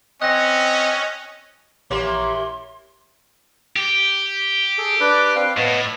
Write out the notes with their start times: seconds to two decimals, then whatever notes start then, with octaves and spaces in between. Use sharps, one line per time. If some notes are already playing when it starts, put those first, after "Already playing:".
0.22 C4 C#4 D#5 F#6 A#6
1.90 A#1 E3 A#3 G4 C#5 C6
3.76 G4
4.78 G#4 A4
5.00 D4 B4 D5
5.36 C4 B4 F5
5.57 A2 B3 C#5 D#5